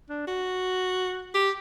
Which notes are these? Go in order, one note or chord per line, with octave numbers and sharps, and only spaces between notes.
D4
F#4
G4